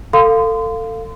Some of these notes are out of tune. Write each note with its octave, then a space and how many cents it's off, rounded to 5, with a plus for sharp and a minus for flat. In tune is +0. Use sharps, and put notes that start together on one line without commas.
A4 +25 F5 +0 C6 -30